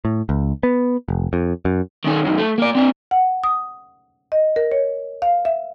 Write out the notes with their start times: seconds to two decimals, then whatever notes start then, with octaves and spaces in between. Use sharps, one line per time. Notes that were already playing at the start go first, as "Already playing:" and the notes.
0.05 A2
0.29 C#2
0.63 B3
1.08 F1
1.33 F2
1.65 F#2
2.05 D#3 C#4
2.25 F#2 D#3
2.38 A3
2.58 A#3 D5
2.75 C4 D4
3.11 F#5
3.44 D#6
4.32 D#5
4.56 A#4
4.72 C#5
5.22 F5
5.45 E5